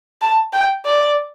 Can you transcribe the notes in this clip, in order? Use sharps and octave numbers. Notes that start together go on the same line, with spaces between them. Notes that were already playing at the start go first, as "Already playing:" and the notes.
A5
G5
D5